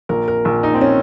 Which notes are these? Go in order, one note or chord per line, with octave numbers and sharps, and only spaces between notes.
A#1 A#4
A#4
A#1
D#4
C4
C#4